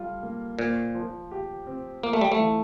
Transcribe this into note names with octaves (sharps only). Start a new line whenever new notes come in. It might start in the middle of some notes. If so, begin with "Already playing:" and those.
Already playing: G3 F4 A4
A#3
A#2 C5
F3
G4
C4
A#3 F4
A3
G3
A3
E3